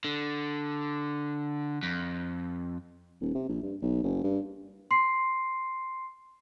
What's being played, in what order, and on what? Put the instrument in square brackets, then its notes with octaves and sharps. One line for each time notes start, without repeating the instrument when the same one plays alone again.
[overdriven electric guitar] D3
F2
[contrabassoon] D#1
C3
A#1
G2
B1
F#1
G2
[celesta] C6 C7